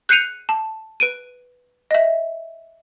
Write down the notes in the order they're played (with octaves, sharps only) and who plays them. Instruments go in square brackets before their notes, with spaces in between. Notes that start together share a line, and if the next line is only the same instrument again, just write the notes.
[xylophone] F#6 G6 C7 C#7 D#7 F7
A5
B4 D7 D#7
D#5 E5